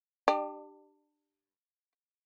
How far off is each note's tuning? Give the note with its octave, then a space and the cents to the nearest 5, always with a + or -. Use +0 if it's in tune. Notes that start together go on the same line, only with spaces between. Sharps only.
D4 +25 G4 +0 D5 +40